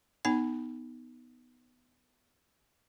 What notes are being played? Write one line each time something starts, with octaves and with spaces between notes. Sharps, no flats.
B3 D#4 G#5 B5